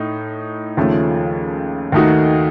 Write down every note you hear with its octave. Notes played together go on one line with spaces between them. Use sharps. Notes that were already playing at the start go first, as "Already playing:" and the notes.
Already playing: A2 A3 D#4
D#2 C#3 F3 A3 C#4
D#2 D#3 A3 D#4 F#4